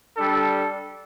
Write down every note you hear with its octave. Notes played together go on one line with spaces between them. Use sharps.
G3 D4 A4